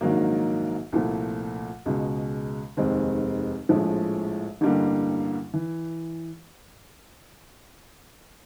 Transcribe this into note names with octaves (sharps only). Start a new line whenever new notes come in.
A#1 G#2 D#3 F#3 A#3
C2 A#2 F3 A3
C#2 B2 G#3
F1 D#2 D#3 G#3 C4
A#1 A2 F3 G#3
A1 G2 D3 G3 A#3
E3